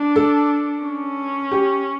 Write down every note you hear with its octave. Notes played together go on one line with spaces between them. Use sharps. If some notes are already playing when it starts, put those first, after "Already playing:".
Already playing: D4
A4
C#4
G4